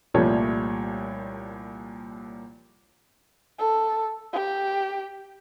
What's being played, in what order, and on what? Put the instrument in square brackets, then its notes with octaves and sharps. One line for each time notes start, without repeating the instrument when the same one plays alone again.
[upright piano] C2 A#2 F3 G3 A3 C#5
[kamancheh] A4
G4